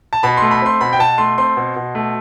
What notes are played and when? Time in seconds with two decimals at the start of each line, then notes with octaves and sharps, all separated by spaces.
0.13 A5
0.23 B2 B5
0.37 A3 C6
0.51 B5
0.62 C4 C6
0.81 B2 B5
0.93 G5
0.99 B2 A5
1.18 A3 C6
1.38 C4 C6
1.57 B2
1.76 B2
1.95 A3